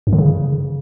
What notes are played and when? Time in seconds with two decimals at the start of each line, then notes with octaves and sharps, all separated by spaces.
0.07 F#2
0.13 D3
0.18 C#3